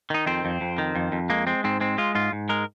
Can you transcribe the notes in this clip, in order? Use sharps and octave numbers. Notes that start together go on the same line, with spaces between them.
D#3 D#4
F2 C4
F2
F2
D#3
F2
F2
G#3 A#3
G#3 C4
G#2 C4
G#3 C4
G#3 F4
G#2 F4
G#2
G#3 A#4